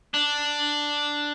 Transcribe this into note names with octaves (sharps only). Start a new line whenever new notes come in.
D4